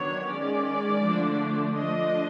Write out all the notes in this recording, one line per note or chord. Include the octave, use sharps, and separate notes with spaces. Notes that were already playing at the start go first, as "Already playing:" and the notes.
Already playing: D#3 F#3 B3 D4 C#5
D#3 G#3 C#4 D5
D3 F3 A3 D4
F3 A3 D4 D#5